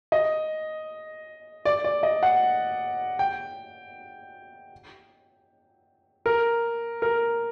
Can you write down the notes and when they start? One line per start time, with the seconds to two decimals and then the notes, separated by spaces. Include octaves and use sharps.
0.12 D#5
1.65 D5
1.84 D5
2.03 D#5
2.23 F#5
3.19 G5
6.26 A#4
7.02 A#4